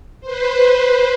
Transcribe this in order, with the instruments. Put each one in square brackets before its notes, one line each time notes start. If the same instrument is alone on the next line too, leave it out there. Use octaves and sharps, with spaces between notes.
[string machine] B4 C5